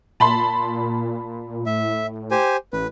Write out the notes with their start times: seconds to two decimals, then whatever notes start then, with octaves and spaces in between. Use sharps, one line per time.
0.20 A#2 A5 B5 C6
1.66 A2 E5
2.31 G4 C5 G#5
2.73 A1 B4